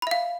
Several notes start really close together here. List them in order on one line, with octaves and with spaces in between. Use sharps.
B5 E5 F5